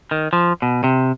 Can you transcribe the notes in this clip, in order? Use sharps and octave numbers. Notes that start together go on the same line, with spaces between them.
D#3
F3
B2
C3